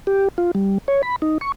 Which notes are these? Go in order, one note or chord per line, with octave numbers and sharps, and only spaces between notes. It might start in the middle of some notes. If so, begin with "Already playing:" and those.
G4
F4
G3
C#5
B5
D#4
C#6